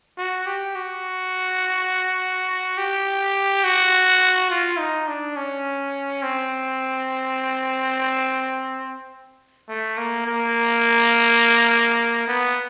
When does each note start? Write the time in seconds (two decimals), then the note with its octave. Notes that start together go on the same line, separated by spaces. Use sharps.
0.18 F#4
0.46 G4
0.75 F#4
2.77 G4
3.64 F#4
4.50 F4
4.79 D#4
5.08 D4
5.36 C#4
6.23 C4
9.69 A3
9.97 A#3
10.26 A#3
12.28 B3